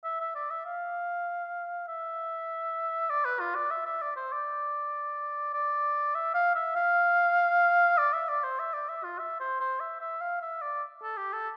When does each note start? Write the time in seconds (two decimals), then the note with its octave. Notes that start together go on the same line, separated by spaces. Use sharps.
0.04 E5
0.20 E5
0.35 D5
0.50 E5
0.66 F5
1.87 E5
3.10 D5
3.25 B4
3.40 F4
3.55 D5
3.71 E5
3.86 E5
4.01 D5
4.16 C5
4.32 D5
5.53 D5
6.15 E5
6.34 F5
6.55 E5
6.76 F5
7.98 D5
8.13 E5
8.28 D5
8.44 C5
8.59 E5
8.73 D5
8.89 E5
9.04 F4
9.19 E5
9.40 C5
9.60 C5
9.80 E5
10.00 E5
10.21 F5
10.42 E5
10.61 D5
11.03 A4
11.17 G4
11.33 A4